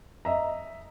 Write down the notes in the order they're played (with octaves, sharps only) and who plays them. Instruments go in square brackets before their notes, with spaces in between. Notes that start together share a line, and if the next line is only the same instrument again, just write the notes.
[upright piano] D#5 E5 A#5